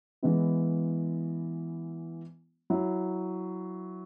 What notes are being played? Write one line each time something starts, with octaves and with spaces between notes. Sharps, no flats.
E3 G#3 B3 E4
F#3 E4